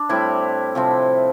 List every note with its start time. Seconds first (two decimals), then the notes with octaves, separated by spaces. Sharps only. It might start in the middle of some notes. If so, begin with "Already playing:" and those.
Already playing: D4
0.09 A2 G3 C4 E4
0.75 C3 F3 C4